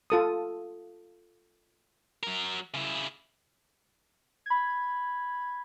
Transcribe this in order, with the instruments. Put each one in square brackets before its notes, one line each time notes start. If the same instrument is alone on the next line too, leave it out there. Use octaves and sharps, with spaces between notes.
[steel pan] F4 A4 D#6
[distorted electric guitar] F#3 A#4
C#3 E4
[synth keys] B5 G#6